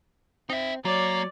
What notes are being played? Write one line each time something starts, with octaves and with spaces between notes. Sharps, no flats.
C4 D#4 E5
F#3 A#3 C#5 D5